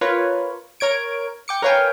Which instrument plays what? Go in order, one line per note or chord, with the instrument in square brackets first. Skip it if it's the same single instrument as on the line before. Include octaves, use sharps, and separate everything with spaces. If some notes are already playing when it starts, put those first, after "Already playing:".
[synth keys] F4 A#4 B4 C#5
A#4 C#5 G#6 D7
G5 D6 C#7
A#4 B4 C#5 F5 G5 G#5